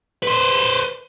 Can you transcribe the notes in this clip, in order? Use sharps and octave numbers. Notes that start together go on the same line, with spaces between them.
B4 C5